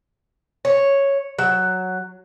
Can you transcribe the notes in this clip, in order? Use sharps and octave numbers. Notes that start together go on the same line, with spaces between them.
C#5
F#3